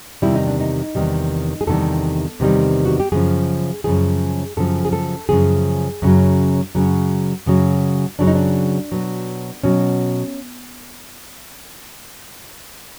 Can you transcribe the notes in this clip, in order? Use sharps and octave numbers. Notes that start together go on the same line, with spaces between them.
E2 C3 D#3 G3 E4
D#4
D4
D#4
E2 C3 D#3 G3
G#4
E2 C3 D#3 G3 A4
E2 C3 D#3 G3
F#4
G4
F#2 C#3 F3 G#4
F#2 C#3 F3 G#4
F#2 C#3 F3 A4
G#4
A4
F#2 C#3 F3 G#4
F#2 C#3 F#3
F#2 C#3 F#3
F#2 C#3 F#3
F#2 C#3 F#3 D4
D#4
D4
B2 F#3
B2 F#3 C#4